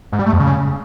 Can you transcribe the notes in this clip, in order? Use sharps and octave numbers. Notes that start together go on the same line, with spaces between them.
G#2
G3
A3
F2
C#3